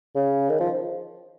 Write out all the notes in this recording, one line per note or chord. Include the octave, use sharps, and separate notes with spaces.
C#3
D#3
F3